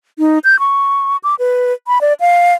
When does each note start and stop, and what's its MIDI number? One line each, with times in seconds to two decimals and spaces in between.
0.19 0.39 63
0.44 0.59 91
0.59 1.17 85
1.24 1.35 86
1.39 1.73 71
1.87 2.01 83
2.01 2.13 74
2.20 2.54 77